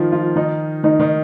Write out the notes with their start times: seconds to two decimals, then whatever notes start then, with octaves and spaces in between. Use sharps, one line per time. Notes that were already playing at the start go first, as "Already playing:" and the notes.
Already playing: D#3 F3 F4
0.12 F3 F4
0.36 D#3 D#4
0.84 D#3 D#4
0.99 D#3 D#4